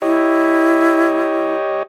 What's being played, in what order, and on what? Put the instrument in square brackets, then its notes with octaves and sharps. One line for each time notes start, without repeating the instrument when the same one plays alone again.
[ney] E4 [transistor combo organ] G4 C#5 D#5